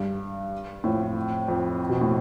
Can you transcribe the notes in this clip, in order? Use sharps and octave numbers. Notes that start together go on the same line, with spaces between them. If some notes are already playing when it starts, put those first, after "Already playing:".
Already playing: G2
F2 A2
F2
B2
A2